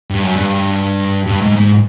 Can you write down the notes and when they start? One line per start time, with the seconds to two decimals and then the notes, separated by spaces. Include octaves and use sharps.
0.10 G2
0.23 F#2
0.36 G2
1.27 G2
1.41 G#2
1.56 G#2